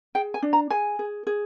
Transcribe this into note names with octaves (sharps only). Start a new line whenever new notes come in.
G#4 G5
G#5
D4
A#5
G#4 G#5
G#4
G#4